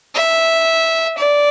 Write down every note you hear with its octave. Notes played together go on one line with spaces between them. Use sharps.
E5
D5